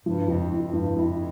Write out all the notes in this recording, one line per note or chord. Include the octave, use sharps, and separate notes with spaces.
G2 F3
F2 F3
F2 E4
G2 F3
F2 E4